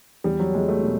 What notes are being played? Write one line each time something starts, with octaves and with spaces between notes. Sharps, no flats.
E2 G3
F#3
E2 G#3
A3
B2